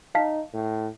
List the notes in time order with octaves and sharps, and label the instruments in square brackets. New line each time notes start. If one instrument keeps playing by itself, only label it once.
[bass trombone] D#4 [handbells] F5 A5 B6
[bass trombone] A2